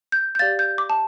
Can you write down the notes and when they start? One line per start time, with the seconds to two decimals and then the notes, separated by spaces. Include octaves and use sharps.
0.12 G6
0.35 G6
0.39 G4 D5 F5 A6
0.59 G6
0.78 D6
0.90 A5